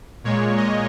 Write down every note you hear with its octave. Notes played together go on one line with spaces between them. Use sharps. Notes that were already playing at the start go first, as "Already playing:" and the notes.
A#2 G#3 C#5
D#5